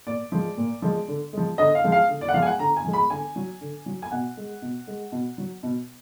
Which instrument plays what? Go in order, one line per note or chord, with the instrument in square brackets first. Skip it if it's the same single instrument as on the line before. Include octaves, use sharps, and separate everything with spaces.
[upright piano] A#2 D5
F3 G#3
A#2
F3 G#3
D3
F3 G#3
D3 D#5
F5
F3 G#3
F5
D3
D5
F#5
F3 G#3 F5
G#5
F#5
D3 A#5
G#5
F3 G#3
B5
D3 G#5
F#3
D3
F#3
G#5
B2 F#5
G#3
B2
G#3
B2
F#3
B2